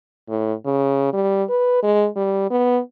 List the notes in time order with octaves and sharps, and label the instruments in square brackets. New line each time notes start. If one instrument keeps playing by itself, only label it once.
[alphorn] A2
C#3
G3
B4
G#3
G3
B3